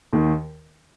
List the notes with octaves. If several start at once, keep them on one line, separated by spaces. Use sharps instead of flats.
D#2 D#3